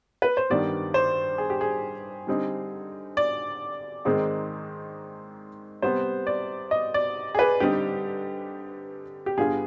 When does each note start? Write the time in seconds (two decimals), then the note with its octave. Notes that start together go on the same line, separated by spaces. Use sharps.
0.22 B4
0.37 C5
0.50 G2 D#3 G3 B3 D5
0.94 C5
1.38 G#4
1.50 G4
1.61 G#4
2.27 D3 G3 C4 D#4
3.17 D5
4.05 G#2 D#3 G#3 C4 D#4
5.82 C3 G3 B3 C5
6.27 D5
6.71 D#5
6.94 D5
7.35 G#4
7.39 B4
7.60 D3 G3 C4 D#4 G4
9.26 G4
9.37 G2 D3 G3 B3 F4 G#4